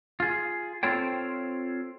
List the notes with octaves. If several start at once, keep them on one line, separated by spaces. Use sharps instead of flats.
F4 G#4
C4 F4 A4 C5 C#5 G5